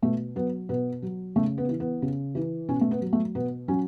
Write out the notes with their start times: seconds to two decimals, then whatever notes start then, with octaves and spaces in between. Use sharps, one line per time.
0.02 B2 A3
0.36 F#3 B3
0.69 B2 B3
1.02 F#3
1.36 C#3 A3
1.58 B3
1.69 E3
1.80 B3
2.02 C#3
2.35 E3
2.68 B2 C#4
2.81 A3
2.91 B3
3.01 F#3
3.13 A3
3.35 B2 B3
3.68 F#3 C#4